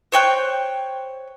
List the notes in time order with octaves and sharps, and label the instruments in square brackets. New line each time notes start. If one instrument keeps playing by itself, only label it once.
[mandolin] C5 C#5 G5 F#6